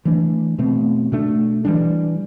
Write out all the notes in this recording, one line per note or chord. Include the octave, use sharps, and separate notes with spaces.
E3 A3 D4
B2 A3 C4
B2 A3 D4
E3 G3 D4